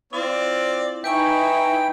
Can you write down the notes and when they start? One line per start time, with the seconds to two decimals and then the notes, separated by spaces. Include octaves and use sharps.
0.13 C4 E4 F4 D5
1.04 D#4 E4 B4 E5 G5 G#5 C#6